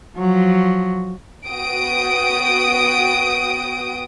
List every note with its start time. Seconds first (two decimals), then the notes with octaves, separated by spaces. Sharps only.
0.18 F3 F#3
1.47 B3 F#4 G5 D#6 D7